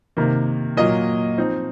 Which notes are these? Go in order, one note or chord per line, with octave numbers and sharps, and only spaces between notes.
C3 D#3 A#3
A#2 F#3 A#3 D#5
F3 C4 D#4